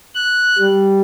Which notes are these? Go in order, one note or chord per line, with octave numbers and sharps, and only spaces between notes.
F#6
G3